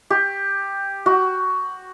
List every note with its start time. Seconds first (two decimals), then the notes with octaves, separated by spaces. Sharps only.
0.10 G4
1.06 F#4